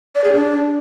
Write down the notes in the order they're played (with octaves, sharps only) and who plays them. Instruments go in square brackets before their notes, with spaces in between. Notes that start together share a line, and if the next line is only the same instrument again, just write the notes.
[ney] D5
G#4
D4